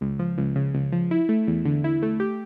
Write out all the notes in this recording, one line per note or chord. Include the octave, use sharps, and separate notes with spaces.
C#2
F3
C#2
C#3
C#2
F3
E4
A3
E2
D3
E4
A3
G4